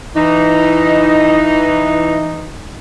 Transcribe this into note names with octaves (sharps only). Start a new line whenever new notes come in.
E3 D#4